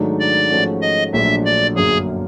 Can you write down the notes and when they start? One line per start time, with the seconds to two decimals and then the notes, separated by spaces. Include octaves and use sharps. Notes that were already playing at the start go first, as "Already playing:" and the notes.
Already playing: G#2 D#3 F#3 A3 D4
0.19 D5
0.50 G#2 F3 A3 C#4 F#4
0.82 D#5
1.13 A#1 A#2 F#3 A3 D4 E5
1.45 D5
1.75 G1 F#2 D3 F#3 A#3 G#4